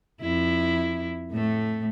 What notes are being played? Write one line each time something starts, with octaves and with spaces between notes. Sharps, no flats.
F2 E4
A2 A3